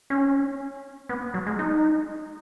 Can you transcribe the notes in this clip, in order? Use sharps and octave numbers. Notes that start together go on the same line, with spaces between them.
C#4
B3
F#3
G#3
D#4